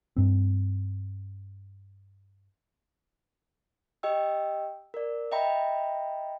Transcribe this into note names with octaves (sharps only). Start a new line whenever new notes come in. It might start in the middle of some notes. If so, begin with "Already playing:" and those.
G2 C4
G4 D#5 G5 E6
A#4 D5
D#5 E5 G5 A#5 B5